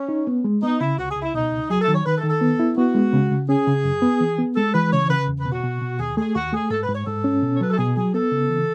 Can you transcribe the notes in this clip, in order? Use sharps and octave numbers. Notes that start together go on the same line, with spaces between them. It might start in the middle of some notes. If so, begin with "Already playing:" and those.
Already playing: C#4
D#4
B3
G#3
B3 D#4
C#3 E4
C#2 F#4
G#4
C#2
E4
B2 D#4
C#2
F#3 G#4
A4
D#3
C#5
D#3 B4
A4
D#3
A4
B3
E4
B3 F#4
G#3
C#3
C#3
C#4 G#4
C#3
F#2
B3
E3
B3
G#3 A4
E3 B4
C#3 C#5
C#3 B4
E2
B4
B2
F#4
B2
B2
D#2 G#4
A3 G#4
D#2 F#4
A3 G#4
G#2 A4
B4
G#2
C#5
G#2 A4
C#4
B2
C#5
F#3 B4
A4
B2 G#4
F#3 G#4
B3 A4
C#3
E3